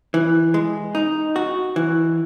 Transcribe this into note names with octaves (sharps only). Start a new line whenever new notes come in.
E3
G#3
D#4
F#4
E3